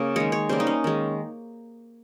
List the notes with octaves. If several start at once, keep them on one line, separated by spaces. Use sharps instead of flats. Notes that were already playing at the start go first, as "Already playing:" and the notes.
Already playing: C#3 A#3
D#3 G#3 C#5
C#5
C#3 G3 A#3 C5
D#4
C#4
D#3 G#3